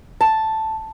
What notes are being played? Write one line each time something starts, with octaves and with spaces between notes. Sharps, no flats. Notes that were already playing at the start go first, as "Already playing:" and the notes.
A5